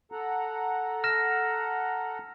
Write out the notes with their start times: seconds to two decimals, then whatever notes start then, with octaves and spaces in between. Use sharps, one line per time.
0.12 A4 F#5 A#5
1.04 F6 A#6 E7